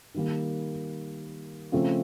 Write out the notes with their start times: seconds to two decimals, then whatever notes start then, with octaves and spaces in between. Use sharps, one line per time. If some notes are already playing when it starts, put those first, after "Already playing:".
0.14 D#3 G3 A#3
1.72 C#3 F3 A3 C4